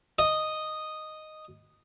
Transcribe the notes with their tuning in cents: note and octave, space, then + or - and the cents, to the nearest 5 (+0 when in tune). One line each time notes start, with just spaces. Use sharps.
D#5 -5